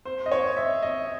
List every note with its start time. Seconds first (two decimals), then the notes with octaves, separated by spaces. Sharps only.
0.05 C5
0.26 D#5
0.32 C#5
0.57 E5
0.82 D#5